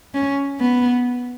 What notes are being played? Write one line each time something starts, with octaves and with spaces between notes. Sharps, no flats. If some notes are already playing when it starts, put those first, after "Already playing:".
C#4
B3